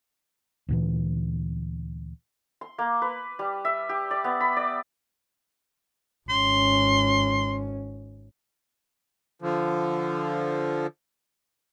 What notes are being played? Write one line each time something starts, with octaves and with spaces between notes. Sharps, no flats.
D2 A#2 E3
C6
A#3
B4
G3
E5
G4
D5
B3
B5
D5
G#1 C#4 C6
D3 F3